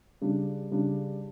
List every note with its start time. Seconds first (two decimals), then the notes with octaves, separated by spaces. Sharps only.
0.21 C#3 G3 D4
0.71 C#3 G3 D4